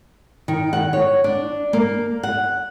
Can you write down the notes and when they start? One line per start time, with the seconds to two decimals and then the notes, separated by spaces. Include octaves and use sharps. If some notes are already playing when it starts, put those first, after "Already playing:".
0.48 D#3
0.73 F#5
0.93 C#5
1.24 D4
1.73 A#3
2.23 F#5